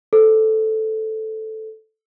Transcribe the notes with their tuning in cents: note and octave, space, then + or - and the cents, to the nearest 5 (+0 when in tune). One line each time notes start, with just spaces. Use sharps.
A4 -5 C5 +0